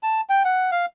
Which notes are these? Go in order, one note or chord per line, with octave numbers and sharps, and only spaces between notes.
A5
G5
F#5
F5